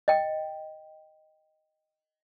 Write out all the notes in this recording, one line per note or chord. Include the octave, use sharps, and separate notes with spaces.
D#5 G5